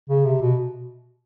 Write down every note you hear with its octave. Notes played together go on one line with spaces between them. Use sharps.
C#3
C3
B2